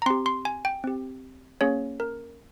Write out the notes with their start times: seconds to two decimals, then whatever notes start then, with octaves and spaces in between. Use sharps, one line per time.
0.02 A#5
0.06 C4 G4 C6
0.26 C6
0.45 G#5
0.65 G5
0.84 C4 G4
1.61 A#3 C#4 G#4 C#5
2.00 A#4